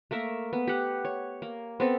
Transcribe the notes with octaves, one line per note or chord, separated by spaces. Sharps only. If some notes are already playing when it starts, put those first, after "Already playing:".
A3 A#3 A#4 E5
B3
G4 F#5
C#5
A#3
B3 C4 A4